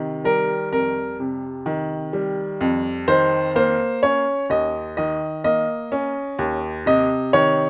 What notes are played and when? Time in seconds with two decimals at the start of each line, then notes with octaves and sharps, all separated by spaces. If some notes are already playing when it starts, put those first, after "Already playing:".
Already playing: C3 D#3
0.24 G3 A#4
0.72 F2 A#4
1.20 C3
1.66 D#3
2.13 G3
2.61 F2
3.08 D#3 C5
3.56 A#3 C5
4.03 C#4 C#5
4.50 D#2 D#5
4.97 D#3 D#5
5.44 A#3 D#5
5.92 C#4
6.39 D#2
6.86 C3 D#5
7.33 D#3 C#5